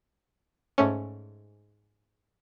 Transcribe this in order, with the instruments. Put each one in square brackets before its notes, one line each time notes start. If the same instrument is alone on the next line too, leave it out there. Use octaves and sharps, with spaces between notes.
[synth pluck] G#2 A3 C#4